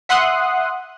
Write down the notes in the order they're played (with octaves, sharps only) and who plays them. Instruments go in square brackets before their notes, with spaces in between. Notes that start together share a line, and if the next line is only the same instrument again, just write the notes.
[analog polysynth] E5 F#5 C6 D#6 F#6